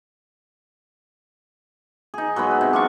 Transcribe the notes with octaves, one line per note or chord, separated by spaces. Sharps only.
D#4 G#4
F#3 G#3 B3 B5
C3
D4 F4 C#6